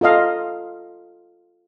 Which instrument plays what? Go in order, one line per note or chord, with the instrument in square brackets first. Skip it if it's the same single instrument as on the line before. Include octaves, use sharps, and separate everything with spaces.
[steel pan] F4 A4 D#5 F5